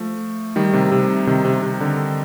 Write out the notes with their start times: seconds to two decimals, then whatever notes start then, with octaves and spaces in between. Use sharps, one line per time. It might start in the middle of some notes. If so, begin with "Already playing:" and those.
Already playing: F3 A3
0.56 D#3 G3
0.73 C3 D#3
0.92 C3
1.27 C3 D#3
1.45 C3
1.63 C3
1.81 D3